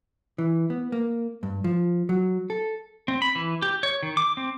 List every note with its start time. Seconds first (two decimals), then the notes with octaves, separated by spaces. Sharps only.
0.38 E3
0.70 B3
0.92 A#3
1.43 G2
1.64 F3
2.09 F#3
2.50 A4
3.08 C4
3.22 B5
3.35 E3
3.62 G4
3.83 C#5
4.03 D#3
4.17 D6
4.37 C4